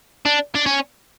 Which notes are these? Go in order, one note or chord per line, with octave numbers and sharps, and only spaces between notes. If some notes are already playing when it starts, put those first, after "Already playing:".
D4
D4
C#4